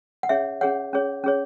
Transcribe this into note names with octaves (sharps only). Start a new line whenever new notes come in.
F#5
C#4 G#4 C#5 E5
C#4 G#4 C#5 F#5
C#4 G#4 C#5
C#4 G#4 C#5